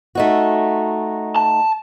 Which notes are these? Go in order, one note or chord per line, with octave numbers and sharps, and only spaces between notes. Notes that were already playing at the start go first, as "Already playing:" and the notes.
A3 D#4 F#4
A5